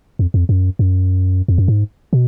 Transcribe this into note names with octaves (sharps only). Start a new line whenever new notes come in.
F2
F2
F#2
F#2
F2
F#2
G#2
B2